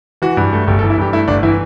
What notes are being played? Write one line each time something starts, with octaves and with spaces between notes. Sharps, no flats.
E3 F#4
G2
A3
G1 G4
A4
E3
E4
G2 G4
A3 E4
G1 D4
E3 E4